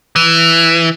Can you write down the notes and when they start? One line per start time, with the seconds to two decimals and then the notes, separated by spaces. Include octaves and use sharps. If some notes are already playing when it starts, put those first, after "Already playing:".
0.16 E3